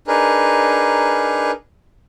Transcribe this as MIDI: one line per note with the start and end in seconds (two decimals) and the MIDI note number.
0.08 1.51 62
0.08 1.51 63
0.08 1.51 68
0.08 1.51 70
0.08 1.51 71